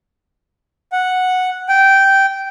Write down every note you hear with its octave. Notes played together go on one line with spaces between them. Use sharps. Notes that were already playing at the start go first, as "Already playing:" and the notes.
F#5
G5